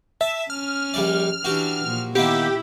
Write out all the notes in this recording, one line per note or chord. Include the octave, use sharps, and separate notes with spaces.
E5 A5
C#4 F6
A#1 G3 D5
E3 D4 F#4 G4
A#2 F3
D#3 A#3 B3 E4 G4